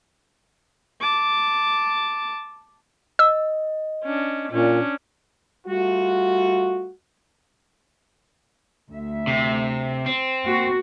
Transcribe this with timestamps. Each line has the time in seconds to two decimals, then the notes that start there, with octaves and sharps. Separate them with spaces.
1.01 A5 D6
3.19 D#5 E6
4.04 C#4 D4
4.52 A#2 C#4 D4
5.67 G3 A3 F4 F#4
8.90 D2 E5
9.27 C3
10.06 C4
10.45 A#3 F#4